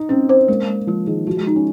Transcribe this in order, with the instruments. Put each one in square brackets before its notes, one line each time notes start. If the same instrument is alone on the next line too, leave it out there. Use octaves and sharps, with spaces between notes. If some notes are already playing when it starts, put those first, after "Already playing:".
Already playing: [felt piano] D#4
[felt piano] C4 [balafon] C#4
[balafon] C5
[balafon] G#3 [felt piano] A#3
[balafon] G#3
[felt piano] F3 [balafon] G#3
[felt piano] D#3 [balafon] G#4
[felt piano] F3 [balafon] F#4
[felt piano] G#3
[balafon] D#4
[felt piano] C#4